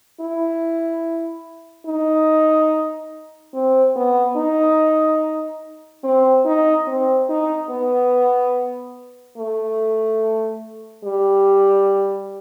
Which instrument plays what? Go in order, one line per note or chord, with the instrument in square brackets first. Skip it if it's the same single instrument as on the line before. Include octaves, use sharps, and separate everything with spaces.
[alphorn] E4
D#4
C4
B3
D#4
C4
D#4
C4
D#4
B3
A3
G3